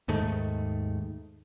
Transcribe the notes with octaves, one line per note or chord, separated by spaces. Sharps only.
D#2 G#2 D#3 A3